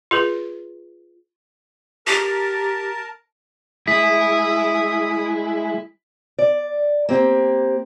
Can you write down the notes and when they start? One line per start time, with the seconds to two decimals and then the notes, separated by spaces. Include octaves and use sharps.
0.11 F4 G#4 B4
2.07 G4 A#4 A5
3.88 G#3 E4 D#6 B6
6.39 D5
7.09 A#3 C4 G4